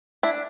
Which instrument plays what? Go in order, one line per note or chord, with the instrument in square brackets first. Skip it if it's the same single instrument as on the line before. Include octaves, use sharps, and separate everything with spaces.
[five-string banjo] D4 E4